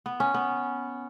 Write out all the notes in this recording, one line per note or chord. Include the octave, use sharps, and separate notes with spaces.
B3
C#4
B3